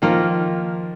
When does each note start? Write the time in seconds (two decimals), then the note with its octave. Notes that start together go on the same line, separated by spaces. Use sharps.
0.02 D#3 F3 A#3 F4 A#4